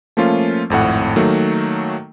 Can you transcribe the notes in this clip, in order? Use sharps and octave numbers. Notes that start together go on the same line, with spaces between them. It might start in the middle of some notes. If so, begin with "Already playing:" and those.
F3 A3 A#3 C#4 F4
G#1 F2 A2 F#5
D#3 F#3 A3 A#3